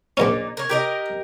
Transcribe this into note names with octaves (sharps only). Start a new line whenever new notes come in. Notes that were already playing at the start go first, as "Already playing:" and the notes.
A#1 A#2 C#4 D#4
A#4 C#5
G4 A#4 D#5